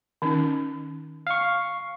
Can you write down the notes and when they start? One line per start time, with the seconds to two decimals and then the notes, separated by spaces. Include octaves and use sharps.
0.22 D#3 C#4 D#4
1.27 F5 C#6